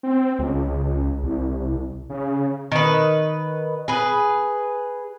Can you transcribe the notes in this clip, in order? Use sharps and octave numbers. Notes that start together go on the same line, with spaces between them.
C4
C#2
C2
C#3
D#3 B4
G#4 B4